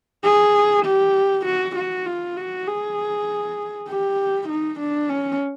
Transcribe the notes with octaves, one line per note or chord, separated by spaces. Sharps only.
G#4
G4
F#4
F#4
F4
F#4
G#4
G4
D#4
D4
C#4